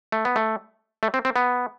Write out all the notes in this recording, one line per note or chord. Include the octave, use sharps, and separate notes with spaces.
A3
B3
A3
A3
C4
C4
B3